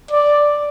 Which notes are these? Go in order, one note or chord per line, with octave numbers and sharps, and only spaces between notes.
D5